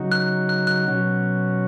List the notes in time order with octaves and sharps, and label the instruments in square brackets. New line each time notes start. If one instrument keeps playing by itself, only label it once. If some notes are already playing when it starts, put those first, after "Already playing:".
Already playing: [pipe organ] C#3 F#3 D#4 F#4
[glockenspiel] F#6
F#6
F#6
[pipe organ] B2 F#3 C#4 F#4